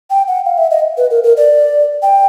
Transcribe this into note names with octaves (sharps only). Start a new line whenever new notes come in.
G5
F#5
F5
E5
D#5
B4
A#4
A#4
D5
G5